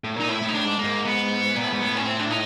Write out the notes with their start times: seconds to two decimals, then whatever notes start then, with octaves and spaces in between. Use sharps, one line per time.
0.04 A2
0.16 A#2 D#4
0.29 A2 E4
0.42 A2
0.48 D#4
0.54 A2 D4
0.64 G#2
0.79 G#2 A#3
1.05 B3
1.55 A#2
1.64 A2
1.73 G#2
1.82 A2
1.97 C#4
2.05 C4
2.19 D4
2.30 D#4